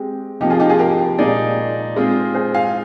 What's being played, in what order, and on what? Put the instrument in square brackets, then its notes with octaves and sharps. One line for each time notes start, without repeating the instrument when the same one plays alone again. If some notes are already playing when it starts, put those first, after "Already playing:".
Already playing: [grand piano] G#3 C4 G4
[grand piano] C3 F3 A#3 [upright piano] D#4 G4
[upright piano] F4 G#4
D#4 G4
F4 G#4
G4 A#4
[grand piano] A#2 G#3 D#4 G#4 D5
G#3 C4 F4 G#4
[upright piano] G#4 C5
F5 G#5